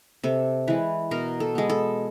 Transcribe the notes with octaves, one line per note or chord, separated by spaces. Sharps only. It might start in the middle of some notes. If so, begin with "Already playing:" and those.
C3 A4
E3 G#3 B4
B2 A#4
A4
G#3 B3
A4